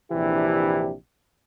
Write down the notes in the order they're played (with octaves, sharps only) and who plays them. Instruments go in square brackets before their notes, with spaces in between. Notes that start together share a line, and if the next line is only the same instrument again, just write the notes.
[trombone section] A#1 C3 E3 D4 E4 G4